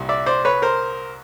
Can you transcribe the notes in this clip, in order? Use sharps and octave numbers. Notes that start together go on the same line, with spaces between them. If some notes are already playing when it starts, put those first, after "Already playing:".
Already playing: C2 A#2 G3
D5 E5
C5 D5
B4 C#5
A#4 C5